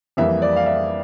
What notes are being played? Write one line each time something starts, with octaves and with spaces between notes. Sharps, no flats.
F2 E3 G3 A#3 E5
D5
F5
E5